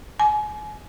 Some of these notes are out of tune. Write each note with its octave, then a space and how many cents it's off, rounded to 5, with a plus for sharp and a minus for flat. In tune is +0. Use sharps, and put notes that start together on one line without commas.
G#5 +30